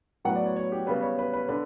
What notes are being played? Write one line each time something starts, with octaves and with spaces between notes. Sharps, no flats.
A2 F#3 B3 F#5
D5
C#5
C#5
G4
C#3 G3 B3 B4
C#5
B4
B4
D3 B4